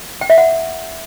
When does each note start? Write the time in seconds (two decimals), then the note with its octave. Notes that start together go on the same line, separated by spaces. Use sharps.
0.21 G5
0.30 E5
0.38 F#5